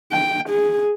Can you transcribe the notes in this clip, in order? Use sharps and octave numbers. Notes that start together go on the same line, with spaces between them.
G5
G#4